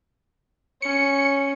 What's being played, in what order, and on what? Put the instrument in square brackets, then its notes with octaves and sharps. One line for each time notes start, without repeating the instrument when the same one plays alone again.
[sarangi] C#4 [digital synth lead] C#7